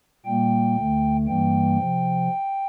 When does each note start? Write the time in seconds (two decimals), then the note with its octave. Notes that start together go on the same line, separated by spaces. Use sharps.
0.25 A#2 G3 A#3 G5
0.76 D2 D3 A3
1.27 G2 E3 G3 A#3 G5
1.78 C3 F3